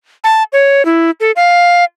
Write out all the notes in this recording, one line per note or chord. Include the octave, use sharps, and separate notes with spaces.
A5
C#5
E4
A4
F5